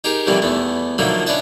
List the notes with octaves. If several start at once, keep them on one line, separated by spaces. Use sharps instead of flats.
D#4 G4 G#4 A#4
A2 C3 E3 F3 G3 A#3
E2 A3 B3
D3 F3 F#3 A3 A#3 D#4
C#4 D4 B4 D#5 E5 A5